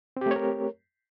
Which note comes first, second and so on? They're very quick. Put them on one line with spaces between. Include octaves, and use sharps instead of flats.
C4 G4 A3 C#5 A#4